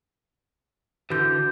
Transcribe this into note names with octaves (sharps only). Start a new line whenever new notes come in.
D3 E3 F#4 G6